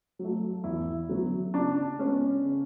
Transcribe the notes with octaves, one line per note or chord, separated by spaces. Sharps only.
F#3 A3
E2 E4
D3 F#3 B3
C#3 D4
G#3 B3 C#4
C#3